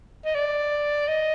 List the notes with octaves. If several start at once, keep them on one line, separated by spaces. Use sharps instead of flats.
D#5
D5
D#5